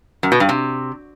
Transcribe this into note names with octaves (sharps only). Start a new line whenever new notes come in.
F#2
B2
G2
C3